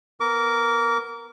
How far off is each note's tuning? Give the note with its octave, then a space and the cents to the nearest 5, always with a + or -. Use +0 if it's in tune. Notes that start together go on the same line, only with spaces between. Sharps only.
B3 +0 A#4 +0 D6 -30